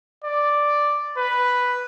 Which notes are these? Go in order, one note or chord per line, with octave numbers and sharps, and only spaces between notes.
D5
B4